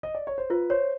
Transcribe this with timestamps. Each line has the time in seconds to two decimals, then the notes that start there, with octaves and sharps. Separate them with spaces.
0.03 D#5
0.15 D5
0.27 C#5
0.38 C5
0.50 F4 B4
0.70 C5 C#5